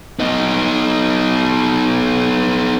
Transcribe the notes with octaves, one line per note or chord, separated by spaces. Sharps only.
B3 D#4